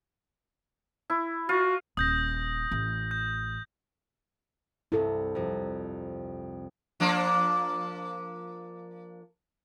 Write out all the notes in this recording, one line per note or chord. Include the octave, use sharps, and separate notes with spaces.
E4
F4 F#4
D#1 D#6 G6 A#6
A1
G6
C2 G2 E4 A4
F2 C3
F3 A#3 D4